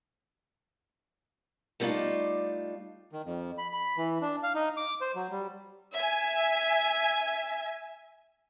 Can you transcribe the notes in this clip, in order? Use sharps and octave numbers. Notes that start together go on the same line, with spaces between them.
G3 A3 B3 D4 D#4 F4
D#3
F2
B5
B5
E3
D4
F5
D#4
D6
C5
F#3
G3
E5 G#5